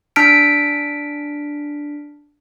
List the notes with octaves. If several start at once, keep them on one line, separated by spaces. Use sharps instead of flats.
D4 A5 F6 B6 D7